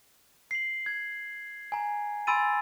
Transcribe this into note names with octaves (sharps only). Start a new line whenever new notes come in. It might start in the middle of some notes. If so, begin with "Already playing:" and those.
C7 F#7
G#6
G#5 A#5
G#5 B5 C6 E6 A6 D#7